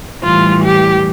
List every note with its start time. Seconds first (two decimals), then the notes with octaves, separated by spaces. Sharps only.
0.22 A2 E3 G3 F4
0.63 G4